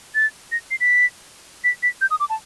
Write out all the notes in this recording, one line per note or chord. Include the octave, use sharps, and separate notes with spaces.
A6
A#6
C7
B6
B6
B6
G6
D#6
D6
A5